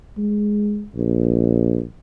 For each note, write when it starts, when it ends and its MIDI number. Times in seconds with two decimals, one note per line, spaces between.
0.17 0.85 56
0.95 1.83 34